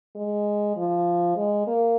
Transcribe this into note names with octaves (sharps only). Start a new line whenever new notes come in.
G#3
F3
G#3
A#3